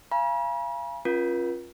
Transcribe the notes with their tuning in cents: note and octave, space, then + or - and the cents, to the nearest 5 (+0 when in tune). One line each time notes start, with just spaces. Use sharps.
F5 -30 G#5 +0 B5 -45
C#4 -25 F4 +5 A#4 +45